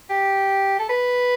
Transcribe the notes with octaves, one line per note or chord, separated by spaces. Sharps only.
G4
A4
B4